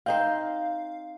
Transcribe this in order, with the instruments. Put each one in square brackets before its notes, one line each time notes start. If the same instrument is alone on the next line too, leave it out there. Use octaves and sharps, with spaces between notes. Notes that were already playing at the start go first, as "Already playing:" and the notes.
[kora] C4 D#4 C5 [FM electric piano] F5